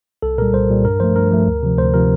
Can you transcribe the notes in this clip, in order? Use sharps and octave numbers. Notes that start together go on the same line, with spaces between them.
C2 A4
A#2 G3 A#4
C2 C5
A#2 G3
G2 A#4
F3 A3 C5
G2 A#4
F3 A3
D2
C3 F3
D2 C5
C3 F3 A#4